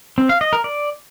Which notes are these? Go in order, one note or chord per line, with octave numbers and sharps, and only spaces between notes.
C4
F5
D#5
A#4
D5